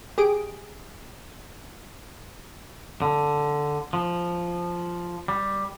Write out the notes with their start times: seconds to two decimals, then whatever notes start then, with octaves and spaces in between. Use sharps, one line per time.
0.18 G4 G#4 D#6 D7
3.02 D3
3.93 F3
5.28 G3